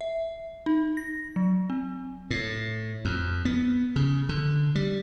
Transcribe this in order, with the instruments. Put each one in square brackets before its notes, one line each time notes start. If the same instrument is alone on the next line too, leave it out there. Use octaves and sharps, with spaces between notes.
[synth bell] E5
D#4
A#6
F#3
C4
[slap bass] A2
F2
B3
C#3
D3
G3